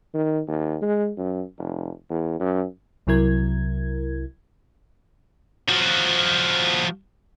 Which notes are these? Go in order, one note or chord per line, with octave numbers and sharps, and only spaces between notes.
D#3
D#2
G#3
F#2
F1
E2
F#2
C2 C3 F#3 E4 A#4 G#6
F3 F#4